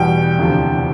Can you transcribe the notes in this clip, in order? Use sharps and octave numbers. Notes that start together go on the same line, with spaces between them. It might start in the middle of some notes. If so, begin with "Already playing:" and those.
Already playing: E2 B2 G3 G5
E1 D2 C3 F3